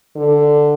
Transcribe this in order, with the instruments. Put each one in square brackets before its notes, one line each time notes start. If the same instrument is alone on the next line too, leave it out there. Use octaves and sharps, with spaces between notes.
[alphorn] D3